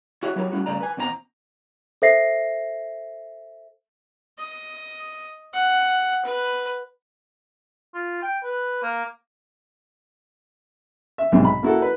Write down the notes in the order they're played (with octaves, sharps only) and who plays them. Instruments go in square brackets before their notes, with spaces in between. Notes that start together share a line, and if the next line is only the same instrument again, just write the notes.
[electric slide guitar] E4 F#4 G#4 C#5 E5
F#3 E4 G4 A#4 C#5
G3 A3 C#4 E4 F#4
G2 C#3 A3 D5 A#5
B4 G#5
E2 B2 C4 F4 A#5
[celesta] A4 C5 E5 A#6 C7
[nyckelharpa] D#5
F#5
B4
[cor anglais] F4
G5
B4
A#3
[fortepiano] E5
B1 G#2 C3
B5
A#3 E4 F#4 A4
B4